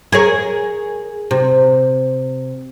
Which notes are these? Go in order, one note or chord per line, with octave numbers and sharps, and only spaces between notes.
G#4 A#4 C#5
C3